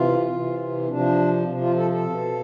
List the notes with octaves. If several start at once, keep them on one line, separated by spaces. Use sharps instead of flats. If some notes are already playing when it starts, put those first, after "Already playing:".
Already playing: C3 E3 F4
C3 E3
C3 F3 D4
C3 F3
F4
A4
A4
B2